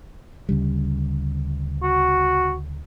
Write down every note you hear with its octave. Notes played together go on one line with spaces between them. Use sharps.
D2 C#3 G3
F#4